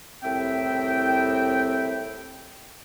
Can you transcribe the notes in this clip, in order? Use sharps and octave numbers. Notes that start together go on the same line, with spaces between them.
C2 A2 C4 E5 G5